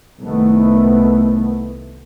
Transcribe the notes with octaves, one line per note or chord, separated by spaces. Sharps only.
C2 D#3 A3 B3